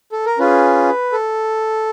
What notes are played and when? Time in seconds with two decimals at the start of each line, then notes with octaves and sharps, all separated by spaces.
0.12 A4
0.26 A#4
0.39 C#4 F4 G#4 B4
1.12 A4